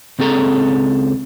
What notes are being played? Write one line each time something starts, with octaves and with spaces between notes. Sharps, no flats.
C#2 C4 G#4 A4 A#5